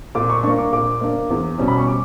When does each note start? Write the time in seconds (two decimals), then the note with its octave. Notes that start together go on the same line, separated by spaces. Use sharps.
0.15 A#2 D6
0.30 C#6
0.43 A#3 D4 C#6
0.58 D6
0.72 A#2 D6
1.01 A#3 D4
1.30 E2
1.58 B2 G3 C#4
1.68 B5
1.78 C#6
1.87 D6